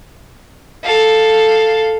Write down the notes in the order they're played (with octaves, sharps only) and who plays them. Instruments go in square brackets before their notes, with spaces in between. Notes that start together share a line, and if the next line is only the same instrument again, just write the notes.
[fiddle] A4 F5